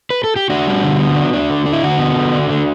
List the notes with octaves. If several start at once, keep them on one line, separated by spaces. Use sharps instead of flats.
B4
A4
G4
D4 F#4
G3
D3
B3
D4
D4
D3
D4
E4
D3 F#4
B3
D3
D4
D3